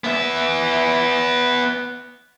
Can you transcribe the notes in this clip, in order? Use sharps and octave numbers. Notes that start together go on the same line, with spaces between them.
B3 E5